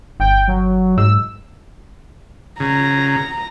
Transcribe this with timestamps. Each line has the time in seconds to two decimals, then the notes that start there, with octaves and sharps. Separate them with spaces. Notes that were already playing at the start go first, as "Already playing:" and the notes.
0.20 G1 G5
0.48 F#3
0.98 G#2 E6
2.60 C#3 A#5